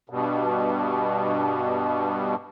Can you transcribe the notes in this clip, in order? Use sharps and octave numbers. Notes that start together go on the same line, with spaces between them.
G2 B2